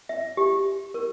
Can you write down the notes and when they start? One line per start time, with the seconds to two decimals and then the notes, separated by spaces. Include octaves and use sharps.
0.09 E5
0.37 G4
0.94 A#4